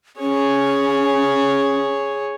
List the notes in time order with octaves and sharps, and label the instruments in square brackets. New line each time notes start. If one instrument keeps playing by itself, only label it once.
[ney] C#4 [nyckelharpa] G#4 C#5